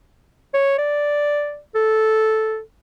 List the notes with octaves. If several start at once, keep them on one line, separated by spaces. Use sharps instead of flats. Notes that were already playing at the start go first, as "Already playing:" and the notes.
C#5
D5
A4